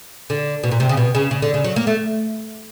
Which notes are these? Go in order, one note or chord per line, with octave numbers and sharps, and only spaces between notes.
D3
B2
A#2
C3
C#3
B2
C#3
C#3
D3
C#3
F#3
A#3
A3